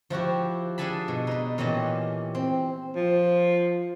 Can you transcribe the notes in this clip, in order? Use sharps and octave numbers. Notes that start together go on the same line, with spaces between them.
F3 E4 F#4 G4
D4 G#4 A4 G#5 A5 B5
B2
D#4 B4
A#2 E3 C#4 G4 D#5 A5
C4
F3